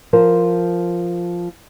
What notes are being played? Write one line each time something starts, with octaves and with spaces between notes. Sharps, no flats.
F3 A#4 C5